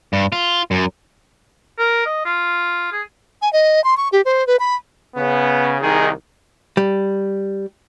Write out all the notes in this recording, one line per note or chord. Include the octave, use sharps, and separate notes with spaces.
G2
F4
F#2
A#4
D#5
F4
G#4
G#5
D#5
C6
C#6
G4
C5
B4
B5
C#3 B3
C2 D#3 D#4 G#4
G3